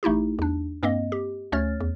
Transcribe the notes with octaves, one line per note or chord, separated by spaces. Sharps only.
A1 A3 D#4 E4 G4
E2 D4
G2 A#3 C4 D#5
G4
D2 A3 C#4 C#5 F6 A6
E2